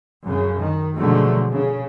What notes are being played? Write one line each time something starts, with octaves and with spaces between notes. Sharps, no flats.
F#2 C#3
D#3
B2 D3 F3 F#3 G#3 A3
C#3